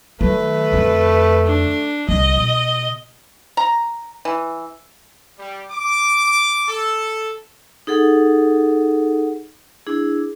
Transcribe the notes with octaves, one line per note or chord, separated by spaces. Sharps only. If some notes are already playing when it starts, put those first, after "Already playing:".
D#3 F#3 A3 B4
F2 D3
D4
C2 C3 D#5
B2
A#5
E3
G3
D6
A4
D#4 G#4 A4 F#5
D4 E4 G#4